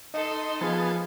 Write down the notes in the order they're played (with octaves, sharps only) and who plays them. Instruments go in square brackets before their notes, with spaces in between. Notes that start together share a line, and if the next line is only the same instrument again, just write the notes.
[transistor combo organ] D#4 [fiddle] A4 C6 [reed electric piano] D#5
[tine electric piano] F3 G#4 [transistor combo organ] B3 G#5 A5 [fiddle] F5